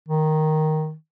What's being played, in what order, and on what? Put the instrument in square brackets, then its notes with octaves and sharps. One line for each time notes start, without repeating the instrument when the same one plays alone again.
[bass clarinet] D#3